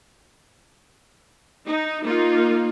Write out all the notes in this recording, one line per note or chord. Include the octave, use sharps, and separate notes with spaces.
D#4
A#3 D#4 F4